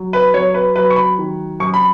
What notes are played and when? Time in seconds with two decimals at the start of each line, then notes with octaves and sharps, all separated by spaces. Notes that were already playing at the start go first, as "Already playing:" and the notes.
Already playing: F#3
0.13 B4
0.34 F#3 C#5
0.54 B4
0.76 F#3 B4
0.90 C#6
0.96 B5
1.18 D#3
1.60 F#2 C#6
1.74 B5